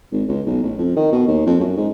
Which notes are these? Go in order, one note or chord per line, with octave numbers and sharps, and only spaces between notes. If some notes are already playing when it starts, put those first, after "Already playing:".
G#1
C#2
B1
A1
F2
D#3
B2
D#2
F2
F#2
G#2